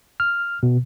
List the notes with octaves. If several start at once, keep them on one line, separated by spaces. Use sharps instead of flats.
F6
B2